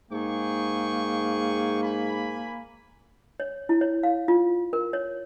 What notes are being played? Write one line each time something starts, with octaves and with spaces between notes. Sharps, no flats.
G#2 A#3 G#4 G5 C#6
G#5 B5
C#5
E4
C#5
F5
F4
A#4
C#5